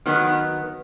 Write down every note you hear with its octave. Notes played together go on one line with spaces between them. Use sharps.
D#3 F#3 B3